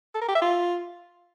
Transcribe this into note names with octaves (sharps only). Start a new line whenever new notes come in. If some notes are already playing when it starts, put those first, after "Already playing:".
A4
A#4
G4
E5
F4